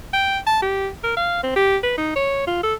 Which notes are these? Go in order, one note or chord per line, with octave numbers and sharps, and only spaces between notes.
G5
A5
G4
A#4
F5
C4
G4
B4
D#4
C#5
F4
A4